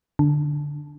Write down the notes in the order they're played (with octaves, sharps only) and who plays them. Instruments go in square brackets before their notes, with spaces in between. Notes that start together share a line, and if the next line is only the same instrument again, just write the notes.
[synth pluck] D3